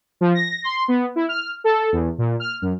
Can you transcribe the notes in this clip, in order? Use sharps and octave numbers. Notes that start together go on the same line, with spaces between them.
F3
A#6
C6
B3
E4
F6
A4
E2
A#2
F6
F#2